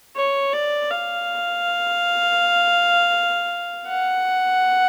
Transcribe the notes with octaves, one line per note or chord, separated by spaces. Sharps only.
C#5
D5
F5
F#5